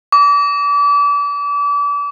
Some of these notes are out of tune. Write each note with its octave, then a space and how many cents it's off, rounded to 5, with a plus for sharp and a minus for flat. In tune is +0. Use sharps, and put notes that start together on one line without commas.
D6 -35